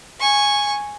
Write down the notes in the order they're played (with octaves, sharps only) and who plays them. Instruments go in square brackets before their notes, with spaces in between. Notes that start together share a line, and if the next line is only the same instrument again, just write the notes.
[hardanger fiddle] G#5 C#6